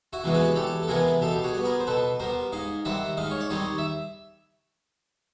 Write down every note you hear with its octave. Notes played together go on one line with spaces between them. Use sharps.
E4 F#4
C3 E3 G#3 B3
F#4 G#4
E2 G4 A4
A4
C3 E3 G#3 B3 G#4 A#4
B2 G4 A4
G4
F#4 G#4
G3 B3
G#4 A#4
C5
B2 A4 B4
G3 B3 A#4 C5
G#2 D#5 F5
D#3 G3 C4 E5 F#5
G#2 D#5 F5
C#5
D5
D#3 G3 C4 C#5 D#5
E5